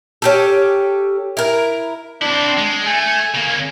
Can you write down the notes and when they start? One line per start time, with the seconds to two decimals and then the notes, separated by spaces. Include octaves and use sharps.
0.22 C#4 G4 A4
1.37 E4 A#4
2.22 C4 D4 E4
2.57 G#3
2.87 A3 G#5
3.35 C#3 A#3